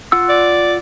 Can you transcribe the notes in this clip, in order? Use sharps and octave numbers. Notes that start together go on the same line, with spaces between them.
F4 F#5 E6
D5